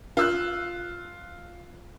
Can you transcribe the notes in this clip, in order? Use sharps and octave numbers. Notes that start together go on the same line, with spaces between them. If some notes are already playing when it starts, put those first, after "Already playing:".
F4 E6 F#6